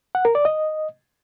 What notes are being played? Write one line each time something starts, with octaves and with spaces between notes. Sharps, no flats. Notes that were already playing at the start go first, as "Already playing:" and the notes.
F#5
A#4
D5
D#5